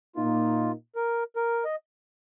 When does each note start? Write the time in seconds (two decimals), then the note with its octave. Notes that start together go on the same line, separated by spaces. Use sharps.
0.15 A#2 A#3 D#4 F4
0.96 A#4
1.36 A#4
1.65 D#5